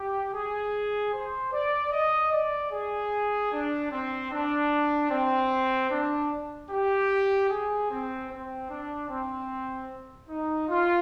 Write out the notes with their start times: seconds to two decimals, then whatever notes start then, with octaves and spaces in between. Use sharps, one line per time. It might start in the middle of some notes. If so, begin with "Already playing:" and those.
Already playing: G4
0.33 G#4
1.13 C5
1.53 D5
1.92 D#5
2.32 D5
2.72 G#4
3.52 D4
3.91 C4
4.32 D4
5.11 C4
5.90 D4
6.71 G4
7.50 G#4
7.91 C4
8.30 C4
8.70 D4
9.09 C4
10.29 D#4
10.68 F4